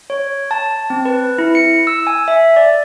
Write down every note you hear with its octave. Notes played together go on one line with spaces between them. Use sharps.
C#5
A5
C4
B4
E4
C#7
E6
G#5
E5
D5